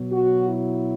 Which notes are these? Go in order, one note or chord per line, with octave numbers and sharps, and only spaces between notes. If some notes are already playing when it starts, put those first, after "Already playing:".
Already playing: B2 F#3
F#4
E4